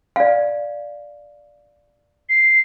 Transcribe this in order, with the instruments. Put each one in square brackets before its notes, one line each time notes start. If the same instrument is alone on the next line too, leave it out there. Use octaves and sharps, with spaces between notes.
[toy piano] D5 F5
[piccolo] C7